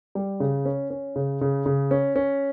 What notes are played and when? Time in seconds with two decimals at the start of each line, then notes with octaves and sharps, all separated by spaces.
0.15 G3
0.40 C#3
0.65 C#4
0.90 C#4
1.16 C#3
1.41 C#3
1.66 C#3
1.91 C#4
2.16 C#4